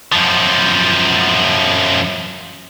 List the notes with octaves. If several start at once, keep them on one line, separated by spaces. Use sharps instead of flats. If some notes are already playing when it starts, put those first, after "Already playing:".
F#2 F3